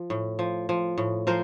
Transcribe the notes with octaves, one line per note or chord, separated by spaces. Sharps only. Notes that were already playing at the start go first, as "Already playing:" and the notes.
Already playing: F3
A2
F3
F3
A2
F3 A#4 C5